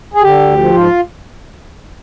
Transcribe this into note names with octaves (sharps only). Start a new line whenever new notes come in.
G#4
D3 G4
D2
F3
G#2 F4